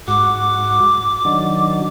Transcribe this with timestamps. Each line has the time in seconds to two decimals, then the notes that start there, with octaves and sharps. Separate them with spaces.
0.08 G#2 F#4 D6
1.25 D#3 F#3 D4